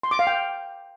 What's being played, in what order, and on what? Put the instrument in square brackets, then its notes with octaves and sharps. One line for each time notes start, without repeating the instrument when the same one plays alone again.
[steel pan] C6
D6
F5
G5